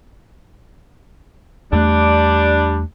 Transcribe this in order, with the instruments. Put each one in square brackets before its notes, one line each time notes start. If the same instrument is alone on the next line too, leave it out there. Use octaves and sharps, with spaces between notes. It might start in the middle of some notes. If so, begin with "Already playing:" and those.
[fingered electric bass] E2 A3 [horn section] G3 D4